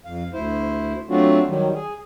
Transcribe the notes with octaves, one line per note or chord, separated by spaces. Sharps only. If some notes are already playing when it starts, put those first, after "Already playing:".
F2 F5
D2 E4 C5
F#3 A3 C4 D4 F4 F#4
D#3 F#3 G3
G#4